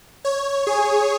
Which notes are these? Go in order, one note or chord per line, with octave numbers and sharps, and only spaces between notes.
C#5
G#4